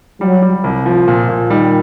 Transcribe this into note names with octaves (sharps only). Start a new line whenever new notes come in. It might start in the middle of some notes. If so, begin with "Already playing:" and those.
F#3 G3
G3
C2
F3
A#2
A#2
D#3 G3